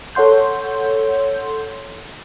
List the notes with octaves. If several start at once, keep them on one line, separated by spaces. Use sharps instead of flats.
A4 C#5 F#5 C6 G6